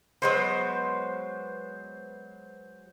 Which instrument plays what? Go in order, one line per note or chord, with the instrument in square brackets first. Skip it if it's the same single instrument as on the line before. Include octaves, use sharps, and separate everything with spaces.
[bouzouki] F#3 G#3 B3 [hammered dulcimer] C5